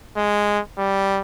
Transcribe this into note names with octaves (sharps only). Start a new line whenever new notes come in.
G#3
G3